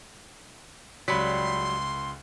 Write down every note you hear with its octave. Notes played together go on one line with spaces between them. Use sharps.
C#2 F#3 G3 B5 C6 B6